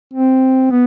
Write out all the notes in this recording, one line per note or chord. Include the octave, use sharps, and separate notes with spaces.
C4
B3